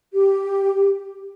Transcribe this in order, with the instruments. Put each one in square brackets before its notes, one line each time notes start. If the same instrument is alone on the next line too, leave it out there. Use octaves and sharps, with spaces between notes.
[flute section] G4